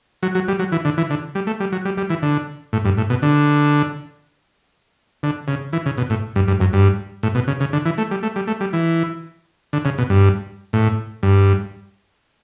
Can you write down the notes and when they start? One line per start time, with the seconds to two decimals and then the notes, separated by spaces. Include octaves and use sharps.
0.23 F#3
0.35 F#3
0.48 G3
0.59 F#3
0.72 E3
0.85 D3
0.98 E3
1.10 D3
1.35 G3
1.47 A3
1.60 G3
1.72 F#3
1.85 G3
1.98 G3
2.10 E3
2.22 D3
2.73 A2
2.85 G2
2.97 A2
3.10 B2
3.22 D3
5.23 D3
5.48 C#3
5.73 E3
5.86 C#3
5.98 B2
6.10 A2
6.36 G2
6.47 G2
6.60 F#2
6.73 G2
7.23 A2
7.35 B2
7.48 C#3
7.60 C#3
7.73 D3
7.85 E3
7.98 A3
8.11 G3
8.23 A3
8.36 G3
8.47 A3
8.61 G3
8.73 E3
9.73 D3
9.85 C#3
9.98 B2
10.10 G2
10.73 A2
11.23 G2